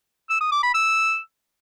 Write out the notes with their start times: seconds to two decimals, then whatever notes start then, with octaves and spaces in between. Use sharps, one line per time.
0.30 E6
0.41 D#6
0.52 D6
0.63 B5
0.74 E6